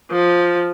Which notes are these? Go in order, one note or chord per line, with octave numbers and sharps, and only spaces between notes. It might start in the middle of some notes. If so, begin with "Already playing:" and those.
F3